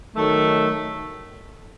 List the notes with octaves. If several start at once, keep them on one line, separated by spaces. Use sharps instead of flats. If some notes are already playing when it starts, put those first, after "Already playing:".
D#3 F#3 A3